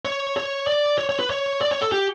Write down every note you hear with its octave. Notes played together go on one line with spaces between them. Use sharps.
C#5
C#5
D5
C#5
C#5
B4
C#5
D5
C#5
A4
G4